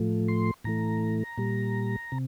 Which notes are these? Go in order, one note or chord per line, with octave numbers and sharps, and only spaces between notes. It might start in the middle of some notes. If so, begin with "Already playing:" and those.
Already playing: A2 F3 A3
C6
A2 E3 A3 A#5
A#2 G3
C3